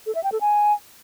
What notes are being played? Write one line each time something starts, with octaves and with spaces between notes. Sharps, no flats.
A4
E5
G5
A4
G#5